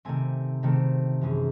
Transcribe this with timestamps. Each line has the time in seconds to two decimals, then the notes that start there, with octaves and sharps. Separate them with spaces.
0.05 C3 D#3 A3 C4 G#5
0.63 C3 D#3 A3 C4
1.21 F#2 E3 G#3 C#4